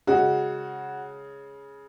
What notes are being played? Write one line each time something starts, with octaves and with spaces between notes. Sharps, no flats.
C#3 G#3 F#4